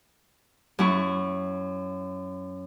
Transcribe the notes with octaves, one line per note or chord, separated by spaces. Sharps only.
F#2 E4 C#6